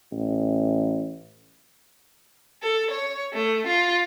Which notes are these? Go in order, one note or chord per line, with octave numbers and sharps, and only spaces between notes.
A1
A4
C#5
A3
F4